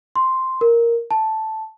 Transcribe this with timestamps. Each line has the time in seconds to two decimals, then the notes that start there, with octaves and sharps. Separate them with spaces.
0.16 C6
0.61 A#4
1.11 A5